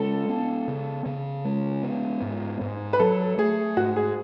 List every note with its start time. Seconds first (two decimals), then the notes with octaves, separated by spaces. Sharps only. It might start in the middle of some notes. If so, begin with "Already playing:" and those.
Already playing: C#3 G#3 A4
0.29 B3
0.68 C#3
1.06 C#3
1.45 G#3
1.83 B3
2.22 G#2
2.61 G#2
2.93 B4
3.00 F#3 A4
3.38 A3 G#4
3.77 G#2 F#4
3.96 G#4